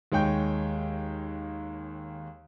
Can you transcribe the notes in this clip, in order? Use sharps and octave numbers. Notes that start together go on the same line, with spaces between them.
D#2 G#3 C#5 G5 G6